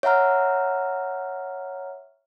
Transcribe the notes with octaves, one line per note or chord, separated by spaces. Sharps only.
C#5 E5 F#5 A#5 F6